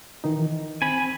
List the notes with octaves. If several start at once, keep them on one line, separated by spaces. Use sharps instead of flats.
D#3 E3 D#4
C4 G#5 B5